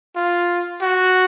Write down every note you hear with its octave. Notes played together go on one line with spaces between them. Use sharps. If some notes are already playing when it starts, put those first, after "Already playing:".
F4
F#4